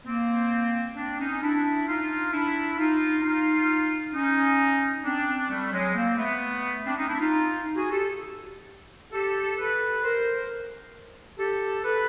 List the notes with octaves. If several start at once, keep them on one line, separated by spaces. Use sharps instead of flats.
A#3 C4
C4 D4
C#4 D#4
D4 E4
D#4 F4
D4 E4
D#4 F4
D#4 F4
C#4 D#4
C4 D4
G3 A3
F#3 G#3
A#3 C4
A3 B3
C4 D4
C#4 D#4
D4 E4
D#4 F4
F#4 G#4
G4 A4
G4 A4
A4 B4
A#4 C5
G4 A4
A4 B4